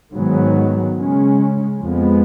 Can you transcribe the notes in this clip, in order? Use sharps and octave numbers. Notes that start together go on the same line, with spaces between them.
G#2 D#3 F#3 B3
C#3 G#3 C#4
F2 F3 G#3 B3